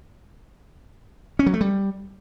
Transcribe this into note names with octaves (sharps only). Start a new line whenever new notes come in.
C#4
F#3
A3
G3